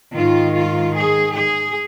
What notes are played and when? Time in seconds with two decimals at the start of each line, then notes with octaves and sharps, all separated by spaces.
0.15 G#2 D#3 F4
0.54 F4
0.93 G#4
1.33 G#4